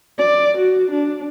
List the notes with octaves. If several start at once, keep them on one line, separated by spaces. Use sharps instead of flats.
D5
F#4
D4